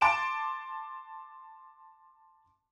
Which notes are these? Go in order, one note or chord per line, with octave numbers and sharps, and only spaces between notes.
A5 C6 D6 D7 E7